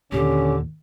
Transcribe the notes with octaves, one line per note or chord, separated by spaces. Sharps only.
D#2 A#2 D3 C#4 G4